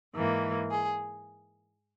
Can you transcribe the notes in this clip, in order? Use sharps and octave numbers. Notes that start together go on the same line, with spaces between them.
G#2 E3 A#3
G#4